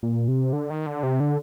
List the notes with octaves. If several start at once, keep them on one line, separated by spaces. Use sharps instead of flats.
A#2
C3
D3
D#3
D3
C3
D3